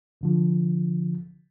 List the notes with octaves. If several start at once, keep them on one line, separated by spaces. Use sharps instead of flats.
C2 D3 F3